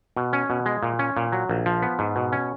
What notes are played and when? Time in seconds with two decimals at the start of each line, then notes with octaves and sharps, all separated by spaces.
0.17 B2
0.33 C#4
0.50 B2
0.66 G#3
0.83 A#2
0.99 C#4
1.17 A#2
1.32 F#3
1.49 A#1
1.66 F3
1.82 B3
1.99 G#2
2.16 B2
2.32 C#4